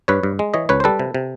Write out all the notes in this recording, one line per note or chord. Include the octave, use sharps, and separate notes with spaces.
G2 B4 C#5
G2
G#3
E3 C#5 D#5
C#2 B4 C#5
C5
G3 A4 B4
C3
C3